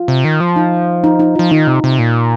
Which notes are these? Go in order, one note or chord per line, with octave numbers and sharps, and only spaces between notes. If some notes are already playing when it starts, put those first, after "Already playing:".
Already playing: F4
C3
D#3
F3
D#4
D#4
D#4
F3 F4
D#3 D#4
C3
C3
A#2